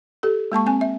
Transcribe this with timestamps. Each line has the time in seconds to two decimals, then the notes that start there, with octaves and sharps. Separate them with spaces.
0.23 G4 A4
0.52 G#3 A#3 A5 C#6
0.66 C4 G#5
0.81 E5